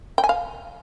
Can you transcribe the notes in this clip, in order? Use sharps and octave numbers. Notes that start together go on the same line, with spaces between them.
G5
G#5
F5